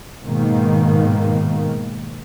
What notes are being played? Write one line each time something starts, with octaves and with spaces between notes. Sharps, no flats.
G#2 B2 D#3 A#3